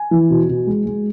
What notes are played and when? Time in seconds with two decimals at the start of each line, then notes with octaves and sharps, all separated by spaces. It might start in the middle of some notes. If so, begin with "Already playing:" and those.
Already playing: G#5
0.11 E3
0.30 B2
0.49 B2
0.67 G#3
0.86 G#3